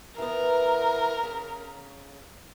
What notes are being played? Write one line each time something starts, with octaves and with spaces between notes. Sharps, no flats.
E3 B3 A#4
C#3